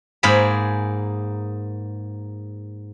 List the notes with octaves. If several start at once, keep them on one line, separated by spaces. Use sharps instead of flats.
G#2 A#3 G#4 B5